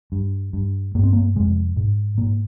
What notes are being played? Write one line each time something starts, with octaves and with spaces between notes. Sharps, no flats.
G2
G2
G2 A#3
C4
A#3
F2 C3 G#3
G#2
G#2 A#3